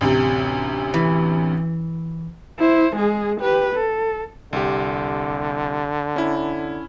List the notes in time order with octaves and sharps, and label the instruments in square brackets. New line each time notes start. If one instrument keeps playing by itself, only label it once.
[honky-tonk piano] A1 D2 C3
[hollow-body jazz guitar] E3
[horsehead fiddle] E4 C5
G#3 G#4
G4 B4
A4
[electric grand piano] C2 G4 [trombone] D3
[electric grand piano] C#4 E4